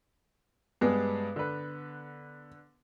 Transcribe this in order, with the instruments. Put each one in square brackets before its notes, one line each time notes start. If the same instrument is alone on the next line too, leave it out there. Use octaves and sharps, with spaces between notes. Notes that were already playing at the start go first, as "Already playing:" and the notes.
[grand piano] G2 G3 G#3 [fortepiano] B3
[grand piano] D3 B4